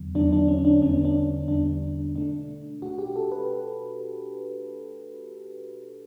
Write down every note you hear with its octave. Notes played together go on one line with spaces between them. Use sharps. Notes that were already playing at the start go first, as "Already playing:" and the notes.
Already playing: E2 D3 F#3 B3
E2 D3 F#3 B3 D4
D4
C#4
D4
E2 D3 G3 B3 C#4
D4
E2 D3 G3 B3 D4
B2 A3 D4
B2 A3 F#4
G4
A4
B4